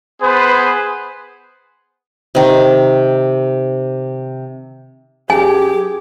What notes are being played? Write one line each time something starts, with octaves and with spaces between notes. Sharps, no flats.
B3 G#4 B4 C5
C3 D#3
F#2 G4 G#4 G#5